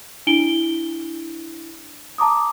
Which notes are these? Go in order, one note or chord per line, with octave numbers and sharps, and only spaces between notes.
D4 E4 D7 G7
A5 A#5 D6 D#6